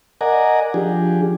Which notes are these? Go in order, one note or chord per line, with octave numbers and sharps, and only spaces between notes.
A#4 D5 D#5 F#5 G#5 A#5
F3 D4 G4 G#4